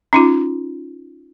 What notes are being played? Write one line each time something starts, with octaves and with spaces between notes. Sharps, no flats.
C#4 D#4 F4